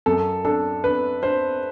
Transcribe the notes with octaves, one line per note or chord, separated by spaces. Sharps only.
F#2 A4
D4 A4
D4 B4
D4 C5